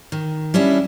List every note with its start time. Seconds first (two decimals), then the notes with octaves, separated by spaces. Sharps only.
0.12 D#3
0.54 G3 C#4 D4 E4